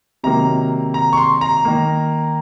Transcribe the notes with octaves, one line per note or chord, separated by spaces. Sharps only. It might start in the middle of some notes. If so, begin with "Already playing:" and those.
C3 D#3 F#3 A#3 A#5
A#5
C#6
C6
A#5
D#3 A#3